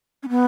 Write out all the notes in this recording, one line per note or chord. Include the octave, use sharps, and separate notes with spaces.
C#4
B3